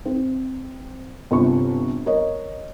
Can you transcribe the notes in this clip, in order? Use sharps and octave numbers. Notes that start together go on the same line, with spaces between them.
C4
G1 C3 F4 C#6
A#4 C#5 D#5